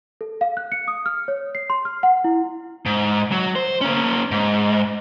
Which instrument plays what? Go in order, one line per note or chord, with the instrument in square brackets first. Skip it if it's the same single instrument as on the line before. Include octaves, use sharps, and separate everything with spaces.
[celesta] A4
F5
F#6
C#7
D#6
F6
C#5
C7
C6
F6
F#5
E4
[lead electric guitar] G#2
F#3
C5
A#3 C#4
G#2